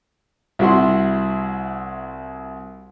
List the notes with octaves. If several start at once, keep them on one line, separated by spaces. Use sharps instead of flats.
C2 E4 F#4 F#5 C6